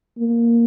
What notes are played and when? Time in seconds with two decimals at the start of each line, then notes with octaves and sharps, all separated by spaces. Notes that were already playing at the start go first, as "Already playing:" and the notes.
0.18 A#3